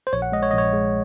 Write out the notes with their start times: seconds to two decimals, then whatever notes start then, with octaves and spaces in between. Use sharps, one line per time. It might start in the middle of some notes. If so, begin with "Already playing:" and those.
0.07 C5
0.13 A#1 C#5
0.22 F#5
0.32 G#3 D#5
0.43 C#5
0.51 A#1 D#5
0.58 C#5
0.73 G#3